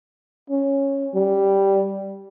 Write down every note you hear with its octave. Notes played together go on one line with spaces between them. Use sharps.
C#4
G3